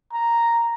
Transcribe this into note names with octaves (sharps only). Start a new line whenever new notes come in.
A#5